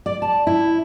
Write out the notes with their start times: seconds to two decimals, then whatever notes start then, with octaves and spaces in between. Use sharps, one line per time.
0.06 D5
0.22 A5
0.47 E4